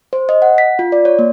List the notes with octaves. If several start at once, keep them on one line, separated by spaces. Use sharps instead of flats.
C5
D#5
F#5
B6
F4
D5
C#5
A#3